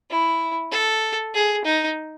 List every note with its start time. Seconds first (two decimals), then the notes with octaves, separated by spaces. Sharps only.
0.10 E4
0.71 A4
1.34 G#4
1.65 D#4